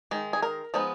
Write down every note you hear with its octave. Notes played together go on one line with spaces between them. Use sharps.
D#3 G#3
G#4
A#4
F3 G#3 B3 D#4